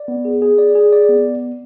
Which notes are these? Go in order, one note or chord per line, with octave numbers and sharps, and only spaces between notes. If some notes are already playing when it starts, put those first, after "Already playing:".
Already playing: D5
B3
G#4
G#4
D5
G#4
D5
B3